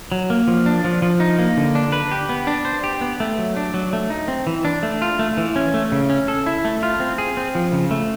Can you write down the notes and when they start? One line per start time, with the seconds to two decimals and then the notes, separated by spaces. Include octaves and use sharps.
0.12 F#3
0.30 A#3
0.48 F3
0.66 D4
0.84 F3
1.02 F3
1.20 D#4
1.39 A#3
1.57 D3
1.75 D4
1.92 B4
2.12 G4
2.29 B3
2.47 D4
2.65 C5
2.84 G4
3.01 B3
3.20 A3
3.39 F#3
3.57 D4
3.74 F#3
3.93 A3
4.10 D#4
4.28 C4
4.47 E3
4.65 D4
4.83 A3
5.02 F4
5.19 A3
5.37 E3
5.56 C#4
5.74 A3
5.92 C#3
6.10 C#4
6.28 A4
6.46 E4
6.65 A3
6.83 F4
7.00 C4
7.18 G#4
7.37 C4
7.55 F3
7.72 C#3
7.91 A3